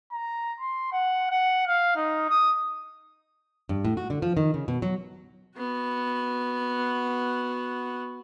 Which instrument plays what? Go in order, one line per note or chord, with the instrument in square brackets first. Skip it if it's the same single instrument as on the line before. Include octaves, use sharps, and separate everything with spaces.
[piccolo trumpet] A#5
C6
F#5
F#5
F5
D#4
D#6
[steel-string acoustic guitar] G2
A2
F#4
D3
F3
D#3
C#3
B2
F#3
[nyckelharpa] B3 F#4